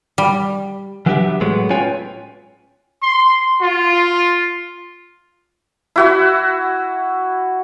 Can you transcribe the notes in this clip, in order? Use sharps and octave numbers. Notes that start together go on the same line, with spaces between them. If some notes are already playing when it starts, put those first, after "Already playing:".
G3
E3 F#3 B3 D4 G4 E5
A2 F#3 G#3 B3
C#4 F4 B4 C#5 G5 G#5
C6
F4
E4 F#4 E5